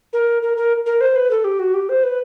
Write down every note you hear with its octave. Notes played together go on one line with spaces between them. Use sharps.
A#4
A#4
A#4
A#4
C5
B4
A4
G4
F#4
G4
C5
B4